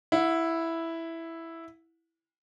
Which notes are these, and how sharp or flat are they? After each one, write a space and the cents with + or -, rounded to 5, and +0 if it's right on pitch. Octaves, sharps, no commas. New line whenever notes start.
E4 +0 F#5 -30